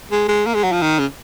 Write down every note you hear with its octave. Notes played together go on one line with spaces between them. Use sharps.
G#3
G#3
A#3
G#3
F#3
F3
D#3
C#3